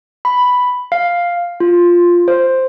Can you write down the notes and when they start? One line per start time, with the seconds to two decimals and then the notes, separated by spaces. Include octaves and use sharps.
0.25 B5
0.92 F5
1.60 F4
2.28 C5